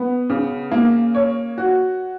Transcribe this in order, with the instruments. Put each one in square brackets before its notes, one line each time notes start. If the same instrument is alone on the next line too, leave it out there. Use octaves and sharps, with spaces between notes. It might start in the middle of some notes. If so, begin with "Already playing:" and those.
Already playing: [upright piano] B3
C#3
A#3
C#5
F#4